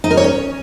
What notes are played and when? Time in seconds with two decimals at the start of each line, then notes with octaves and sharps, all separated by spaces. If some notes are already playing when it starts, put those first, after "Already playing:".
0.04 D#4
0.11 A#4
0.17 C#5
0.24 C#4